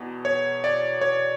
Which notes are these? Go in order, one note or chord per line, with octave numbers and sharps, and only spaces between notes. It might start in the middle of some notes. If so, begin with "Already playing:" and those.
Already playing: E2 B2
C#5
D5
C#5